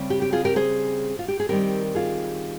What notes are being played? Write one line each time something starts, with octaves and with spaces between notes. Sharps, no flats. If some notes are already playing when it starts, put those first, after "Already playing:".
Already playing: C#3 G3 C4
G4
G4
F4 G#4
G4 A#4
G#4 C5
F4
G4
G#4
D#3 G3 C4 G4 A#4
F4 G#4